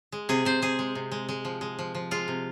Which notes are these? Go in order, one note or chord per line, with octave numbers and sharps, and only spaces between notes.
G#3
C3 G#4
C3 C5
C3 G#4
G#3
C3
G#3
G#3
F3
G#3
F3
F3
G#3 F4
C3